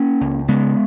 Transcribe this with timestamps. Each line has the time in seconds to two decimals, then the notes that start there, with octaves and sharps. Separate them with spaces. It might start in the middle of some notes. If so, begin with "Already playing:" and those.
Already playing: A#3 C#4
0.21 C#2
0.48 C#3 G#3 B3